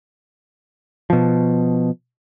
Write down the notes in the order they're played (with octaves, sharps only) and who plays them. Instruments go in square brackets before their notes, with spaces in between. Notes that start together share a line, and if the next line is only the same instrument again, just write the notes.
[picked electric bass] B2 F3